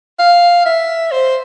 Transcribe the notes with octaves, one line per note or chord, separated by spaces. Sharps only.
F5
E5
C5